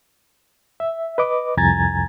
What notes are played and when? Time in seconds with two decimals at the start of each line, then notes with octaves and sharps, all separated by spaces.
0.80 E5
1.18 B4 D#5 D6
1.57 C2 F2 G#5 A#5 G#6 A6